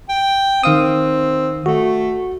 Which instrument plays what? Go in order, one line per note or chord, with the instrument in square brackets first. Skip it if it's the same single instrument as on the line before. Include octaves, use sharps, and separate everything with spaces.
[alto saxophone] G5
[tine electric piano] D#3 F5 D#6 [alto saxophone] C4
[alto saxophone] A3 [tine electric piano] F#4